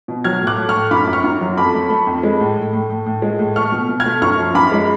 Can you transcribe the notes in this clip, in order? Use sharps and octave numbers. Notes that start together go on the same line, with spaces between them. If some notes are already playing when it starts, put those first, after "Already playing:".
B2
F#3 F6 G#6
A2
D6 F#6
A3
C#6 F6
A2
F#2 B5 D6
F#2
C#6 F6
F#2
F#3
F2 B5 D6
A3
A3
F2
G#3
A2
A2
A2
A2
A2
G#3
A2
A3 C#6 F6
B2
B2
F6 G#6
A3
F#2 C#6 F6
F3
F#2 B5 D6
G#3